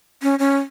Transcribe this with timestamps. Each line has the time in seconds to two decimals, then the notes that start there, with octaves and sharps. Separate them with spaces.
0.22 C#4
0.39 C#4